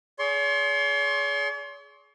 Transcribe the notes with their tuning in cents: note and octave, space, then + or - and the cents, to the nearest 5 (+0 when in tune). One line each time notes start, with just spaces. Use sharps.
G#4 +15 C#5 +45 C6 +25